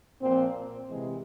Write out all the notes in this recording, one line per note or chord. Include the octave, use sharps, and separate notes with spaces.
A#2 F3 C4
C3 E3 G#3